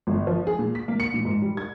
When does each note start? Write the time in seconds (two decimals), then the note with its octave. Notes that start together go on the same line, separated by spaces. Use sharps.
0.07 G1
0.27 F3
0.47 G#4
0.59 A#2
0.75 B6
0.88 A#3
1.00 C#7
1.14 A#2
1.25 G#2
1.42 G3
1.57 G#6